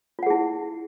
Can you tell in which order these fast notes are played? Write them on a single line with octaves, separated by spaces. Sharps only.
F4 F#5 G#4 E4